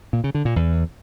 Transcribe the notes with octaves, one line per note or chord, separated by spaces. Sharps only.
A#2
C#3
D3
A#2
E2